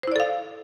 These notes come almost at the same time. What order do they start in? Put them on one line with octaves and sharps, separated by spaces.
C5 E4 D5 A4 F5